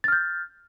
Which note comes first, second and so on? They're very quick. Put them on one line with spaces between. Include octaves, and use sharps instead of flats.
A6 F6 G6